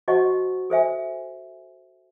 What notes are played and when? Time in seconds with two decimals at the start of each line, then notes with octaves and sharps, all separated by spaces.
0.08 F#4 C5 D#5 F#5 A5 C#6
0.70 A4 C5 E5 G#5